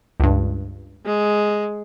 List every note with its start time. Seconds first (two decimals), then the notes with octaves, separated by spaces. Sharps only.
0.20 C#2 G2
1.05 G#3